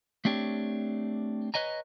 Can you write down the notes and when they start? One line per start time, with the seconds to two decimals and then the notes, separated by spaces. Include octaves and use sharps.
0.25 A3 C4 D4 G4 C#5
1.54 B4 C#5 D#5 G#5 A#5